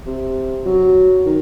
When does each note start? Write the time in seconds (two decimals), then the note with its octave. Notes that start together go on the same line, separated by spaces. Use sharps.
0.06 C3
0.66 F#3
1.26 D#3